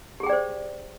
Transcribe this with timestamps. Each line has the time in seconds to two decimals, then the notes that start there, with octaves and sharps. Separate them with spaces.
0.20 G4
0.23 G#4
0.26 G5
0.30 D5
0.33 C5